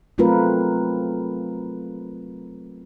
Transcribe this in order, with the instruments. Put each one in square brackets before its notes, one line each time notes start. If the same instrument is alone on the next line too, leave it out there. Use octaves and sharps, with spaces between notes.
[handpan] F#3 A3 C4 F4 A#4 B4